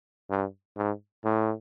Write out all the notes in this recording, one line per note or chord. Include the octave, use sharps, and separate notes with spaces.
G2
G#2
A2